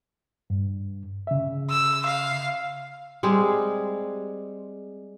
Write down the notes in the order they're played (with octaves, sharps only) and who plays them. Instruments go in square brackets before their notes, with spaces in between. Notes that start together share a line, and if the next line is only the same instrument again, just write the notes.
[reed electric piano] G2
C#3 E5
[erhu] E6
F5
[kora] G3 G#3 C4 G#4